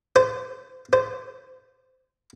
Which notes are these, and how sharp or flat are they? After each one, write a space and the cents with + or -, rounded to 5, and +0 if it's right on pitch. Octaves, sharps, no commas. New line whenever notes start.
C5 -25
C5 -20